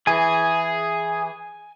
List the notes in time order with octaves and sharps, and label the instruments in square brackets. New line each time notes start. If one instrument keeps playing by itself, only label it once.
[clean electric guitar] E3 [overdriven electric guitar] G#4 [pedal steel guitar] G#5